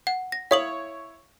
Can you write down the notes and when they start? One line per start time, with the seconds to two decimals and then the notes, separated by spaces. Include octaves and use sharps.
0.07 F#5
0.32 A#6
0.51 E4 C#5 F5 D#6 F#7